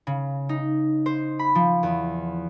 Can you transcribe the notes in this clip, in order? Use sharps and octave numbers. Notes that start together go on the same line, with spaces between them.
C#3
D#4
C5
B5
F3
E2